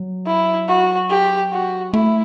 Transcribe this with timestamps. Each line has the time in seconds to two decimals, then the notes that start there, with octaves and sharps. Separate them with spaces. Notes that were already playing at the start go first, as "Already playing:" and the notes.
Already playing: F#3
0.26 E4
0.68 F#4
1.10 G4
1.52 F#4
1.93 A3 E4